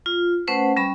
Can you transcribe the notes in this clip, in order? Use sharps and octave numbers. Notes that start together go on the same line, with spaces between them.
F4
A3 C#4 B4 C5 F#5
G3 C#4 B5